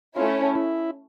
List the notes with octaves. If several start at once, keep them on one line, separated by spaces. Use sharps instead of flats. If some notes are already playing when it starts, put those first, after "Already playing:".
A3 C#4 E4 F4
E4